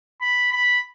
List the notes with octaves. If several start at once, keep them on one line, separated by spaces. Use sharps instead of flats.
B5
B5